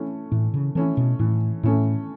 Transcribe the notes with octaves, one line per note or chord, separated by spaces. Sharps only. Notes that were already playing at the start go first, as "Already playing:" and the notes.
Already playing: E3 A3 C#4 E4
A2 E3
C#3
E3 A3 C#4 E4
B2
A2 E3
A2 A3 C#4 E4